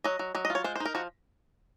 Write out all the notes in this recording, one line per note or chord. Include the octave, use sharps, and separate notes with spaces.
F#3 D#5
F#3
F#3 D#5
D#5
F4
C#5
G#3 C5
C5
D#4
A#4
F3 F#4